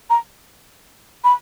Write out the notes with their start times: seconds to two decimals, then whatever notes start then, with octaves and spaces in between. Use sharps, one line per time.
0.10 A#5
1.24 B5